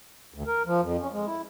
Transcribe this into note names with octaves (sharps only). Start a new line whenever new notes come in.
D2
A#4
F3
F2
C#4
G#3
E4